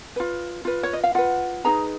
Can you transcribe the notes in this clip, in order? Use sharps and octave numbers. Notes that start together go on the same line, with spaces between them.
F4 B4
F4 B4
C#5
D#5
F5
F4 B4 F#5
D#4 G#4 B4 A#5